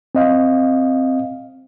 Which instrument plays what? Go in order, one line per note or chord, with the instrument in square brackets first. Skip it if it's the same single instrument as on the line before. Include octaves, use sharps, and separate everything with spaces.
[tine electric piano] C4 D#5 F5